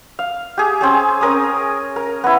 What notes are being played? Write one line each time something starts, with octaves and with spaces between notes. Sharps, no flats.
F5
G4 G#4
C4 C#4 G#4
C#4 A#4 D#6
A#4
B3 E4